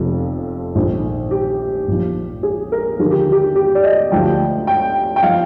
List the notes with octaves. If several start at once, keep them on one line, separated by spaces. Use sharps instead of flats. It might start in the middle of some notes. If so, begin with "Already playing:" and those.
Already playing: F1 F2 C3 F3
A#1 G#2 D#3
G4
A#1 A#2 F3
G#4
A#4
D#2 D3 F3 G#4
G4
G4
G4
D5
D#5
D2 D3 F3 G5
G5
G5
F3 F5